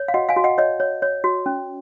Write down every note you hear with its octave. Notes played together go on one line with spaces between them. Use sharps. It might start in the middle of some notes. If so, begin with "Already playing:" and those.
Already playing: C#5
F5
F#4 D#5 F#5
F5 G#5
F#4
D#5 F#5
C#5 D#5
C#5
C#5
F#4
C#4